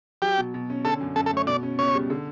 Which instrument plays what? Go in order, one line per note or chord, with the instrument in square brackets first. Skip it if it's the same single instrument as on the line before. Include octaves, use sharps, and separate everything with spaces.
[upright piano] F#3 [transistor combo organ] G4
[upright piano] B2
B2
C#4
[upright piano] D3 [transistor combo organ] A4
[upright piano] F#2
[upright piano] F#2 [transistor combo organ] A4
[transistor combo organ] A4
[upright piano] A3 [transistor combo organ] C#5
[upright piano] B2 [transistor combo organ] D5
[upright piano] C#4
[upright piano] C#2 [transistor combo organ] C#5
[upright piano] G3
D3